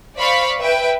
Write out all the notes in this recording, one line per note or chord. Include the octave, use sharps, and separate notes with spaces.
C5 D5 F5 B5 C#6
B4 E5 G5 D7